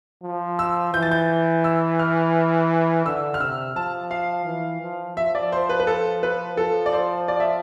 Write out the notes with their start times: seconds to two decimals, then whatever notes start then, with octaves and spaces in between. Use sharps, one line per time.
0.23 F3
0.59 E6
0.94 E3 G6
1.03 A6
1.11 G6
1.64 E6
1.99 F6
3.06 D3 E6
3.34 F6
3.40 C3 E6
3.76 F3 A5
4.11 F5
4.46 E3
4.82 F3
5.17 F3 E5
5.35 D5
5.52 C5
5.69 B4
5.80 B4
5.87 A4
6.23 B4
6.57 F3 A4
6.86 D5
6.93 C5
7.28 D5
7.40 E5